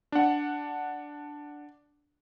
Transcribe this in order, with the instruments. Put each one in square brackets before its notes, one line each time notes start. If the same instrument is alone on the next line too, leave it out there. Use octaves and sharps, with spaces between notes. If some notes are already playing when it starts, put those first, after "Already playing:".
[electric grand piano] D4 F#5